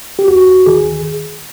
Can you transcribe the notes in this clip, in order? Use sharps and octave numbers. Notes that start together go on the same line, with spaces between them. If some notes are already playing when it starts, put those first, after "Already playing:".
G4
D#2 F#4
D#2
D#3 G#4